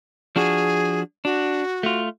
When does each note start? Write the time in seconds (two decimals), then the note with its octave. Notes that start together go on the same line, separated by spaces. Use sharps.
0.36 F3 D4 F#4 G#4
1.25 D4 F#4
1.83 A3 F4